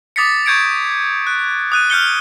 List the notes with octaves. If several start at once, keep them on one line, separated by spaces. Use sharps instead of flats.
D6 D#6 A6 B6 C#7
C#6 G6 G#6 C#7 D7
F#6
D#6 F#6 D#7
F6 G6 C#7 G7